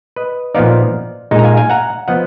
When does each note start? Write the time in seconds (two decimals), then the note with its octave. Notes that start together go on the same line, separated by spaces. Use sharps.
0.16 B4 D#5
0.55 A#2 F3 B3 D#4 D5 F5
1.31 A#2 G#3 D#4
1.39 A#5
1.44 F5 G#5
1.57 F5 G#5
1.70 F#5 A#5
2.08 F3 B3 D#5 F#5